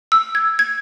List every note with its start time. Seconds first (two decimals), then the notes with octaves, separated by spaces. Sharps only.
0.12 E6
0.35 G#6
0.59 G#6